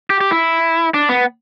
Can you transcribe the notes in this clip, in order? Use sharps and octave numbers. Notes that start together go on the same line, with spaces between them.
G4
G4
E4
D4
B3